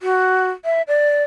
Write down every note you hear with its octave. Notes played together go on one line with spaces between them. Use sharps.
F#4
E5
D5